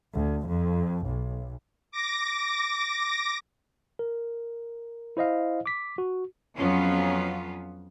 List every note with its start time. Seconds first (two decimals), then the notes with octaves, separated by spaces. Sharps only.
0.16 D2
0.48 F2
1.05 B1
1.91 D6 A#6
3.99 A#4
5.17 E4 C5 D#5 F5
5.66 D6 B6
5.98 F#4
6.56 F2 F#3 B3 C#4 F4